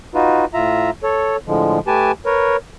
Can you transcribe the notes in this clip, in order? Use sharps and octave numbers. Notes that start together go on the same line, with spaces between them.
D#4 F4 F#4 B4
A2 F4 E5 A#5
A4 C#5
A2 D3 F3 G#3
A3 G4 B4 G#5 A5
A#4 B4 C#5